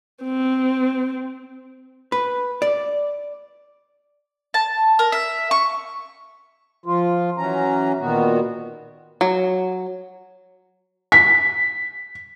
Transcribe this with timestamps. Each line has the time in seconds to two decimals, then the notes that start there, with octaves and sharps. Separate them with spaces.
0.23 C4
2.12 B4
2.62 D5
4.54 A5
4.99 A#4
5.12 E5
5.51 C#6
6.86 F3 F4
7.37 E3 F#3 C#4 A#5
8.00 A#2 D#3 B3 F#4
9.21 F#3
11.12 B6